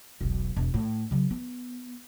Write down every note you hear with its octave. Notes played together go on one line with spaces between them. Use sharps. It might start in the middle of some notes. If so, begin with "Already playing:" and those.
E1 B1
E1
A2
C#3 F#3
B3